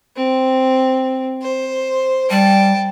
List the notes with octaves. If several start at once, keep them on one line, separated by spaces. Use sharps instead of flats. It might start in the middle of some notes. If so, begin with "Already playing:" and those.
C4
C5
G3 G5 A5